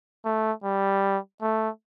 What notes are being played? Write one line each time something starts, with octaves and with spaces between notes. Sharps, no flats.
A3
G3
A3